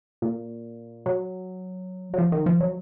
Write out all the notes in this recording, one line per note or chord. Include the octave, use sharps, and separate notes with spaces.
A#2
F#3
F#3
F3
D#3
F3
F#3